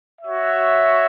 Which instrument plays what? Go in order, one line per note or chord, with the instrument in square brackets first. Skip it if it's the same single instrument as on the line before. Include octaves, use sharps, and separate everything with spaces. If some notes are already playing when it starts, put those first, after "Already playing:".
[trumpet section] F#4 C#5 E5